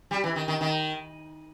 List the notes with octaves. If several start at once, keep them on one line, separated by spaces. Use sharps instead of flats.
G3
E3
D#3
D#3
D#3